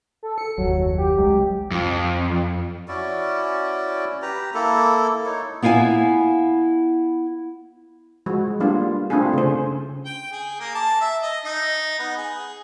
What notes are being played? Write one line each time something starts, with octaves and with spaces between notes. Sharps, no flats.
A4
C#7
F#1 D#2 F#3
G4
C2 F#3 G#3
F2
C#4 E4 F#4 D5
G4 B4 A#5
A#3 E4 A4
D#4 E4 C#5
B3 E4 F5 G5 G#5
F3 G#3 F#4
G3 A#3 B3 D4 F4
A3 C4 D4 F4 G#4
C#3 A3 C5
G5
G#4
A#3
A5
E5
D#5
D#4
B3
G#4